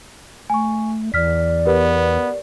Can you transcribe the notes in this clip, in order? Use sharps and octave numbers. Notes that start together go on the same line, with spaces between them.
A3 G#5 C#6
E2 D5 F6 B6
B3 G4 A#4 B4